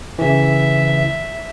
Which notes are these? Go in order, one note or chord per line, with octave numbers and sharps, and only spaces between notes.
C#3 E3 E5